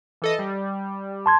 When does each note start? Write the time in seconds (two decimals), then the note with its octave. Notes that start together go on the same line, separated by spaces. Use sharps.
0.22 E3 A4 D#5
0.39 G3
1.26 A5 C6 G#6